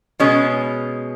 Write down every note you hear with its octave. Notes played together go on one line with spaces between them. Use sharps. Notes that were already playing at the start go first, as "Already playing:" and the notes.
B2 G#3 C#4